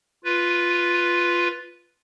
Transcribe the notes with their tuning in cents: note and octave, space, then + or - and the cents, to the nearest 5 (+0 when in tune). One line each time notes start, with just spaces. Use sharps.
F4 +0 B4 +0